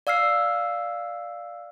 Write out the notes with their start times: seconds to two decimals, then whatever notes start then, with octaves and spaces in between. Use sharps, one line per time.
0.07 D5 F5 E6 F6 C7